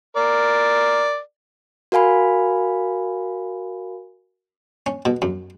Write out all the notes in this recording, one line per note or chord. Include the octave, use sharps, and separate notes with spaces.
A#4 D5
F#4 A#4 F5 G#5 B5
C#4
B2
F#2